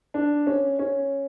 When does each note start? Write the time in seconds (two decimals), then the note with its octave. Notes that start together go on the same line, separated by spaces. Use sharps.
0.14 D4
0.47 C#4
0.79 C#4